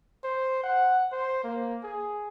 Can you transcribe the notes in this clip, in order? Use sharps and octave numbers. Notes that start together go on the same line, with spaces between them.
C5
F#5
C5
A#3
G#4